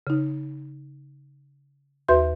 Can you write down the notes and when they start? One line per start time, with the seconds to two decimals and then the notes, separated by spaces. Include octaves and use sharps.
0.07 C#3 D#4
2.08 D#2 F#4 B4 E5 C6 G6